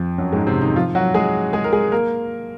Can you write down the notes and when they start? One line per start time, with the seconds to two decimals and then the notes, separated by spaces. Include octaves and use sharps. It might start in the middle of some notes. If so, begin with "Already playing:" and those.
Already playing: F2 F3
0.18 F#2 F#3
0.33 G#2 G#3
0.47 C3 C4
0.61 D#3 D#4
0.76 F3 F4
0.95 F#3 F#4
1.14 G#3 G#4
1.53 G#3 G#4
1.64 A#4
1.73 G#3 G#4
1.92 A#3 A#4